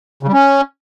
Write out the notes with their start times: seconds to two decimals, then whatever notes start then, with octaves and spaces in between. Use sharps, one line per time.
0.23 C#3
0.28 G3
0.33 C#4